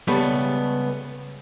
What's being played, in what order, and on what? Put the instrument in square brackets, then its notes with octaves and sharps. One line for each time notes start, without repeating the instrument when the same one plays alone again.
[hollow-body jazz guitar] C#2 G3 A3 B3